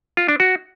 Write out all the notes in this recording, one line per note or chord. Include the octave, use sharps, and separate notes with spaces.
F4
D4
F#4